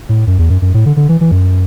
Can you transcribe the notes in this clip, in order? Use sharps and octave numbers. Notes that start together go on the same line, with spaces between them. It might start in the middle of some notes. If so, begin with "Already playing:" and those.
A2
F#2
E2
F#2
F#2
A2
D3
D3
E3
E3
F#2